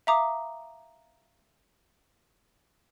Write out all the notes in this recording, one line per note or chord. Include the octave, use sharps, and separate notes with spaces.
E5 F5 A#5 D6 D#6